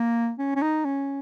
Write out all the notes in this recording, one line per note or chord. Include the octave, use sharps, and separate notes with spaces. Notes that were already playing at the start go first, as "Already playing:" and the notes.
Already playing: A#3
C#4
C#4
D#4
C#4